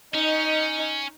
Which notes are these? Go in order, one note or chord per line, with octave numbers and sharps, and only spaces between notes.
C#4 D#4 D#5